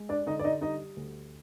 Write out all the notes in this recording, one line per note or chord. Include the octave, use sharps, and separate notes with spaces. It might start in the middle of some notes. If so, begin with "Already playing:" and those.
Already playing: G#3
D4 D5
D3 D#4 D#5
D5
D#4 D#5
G3 D#4 D#5
D2